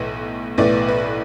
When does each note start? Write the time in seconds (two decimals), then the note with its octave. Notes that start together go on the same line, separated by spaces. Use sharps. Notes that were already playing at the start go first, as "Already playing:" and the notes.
Already playing: B1 A2 E3 B3
0.58 B1 A2 E3 B3 D5
0.88 B4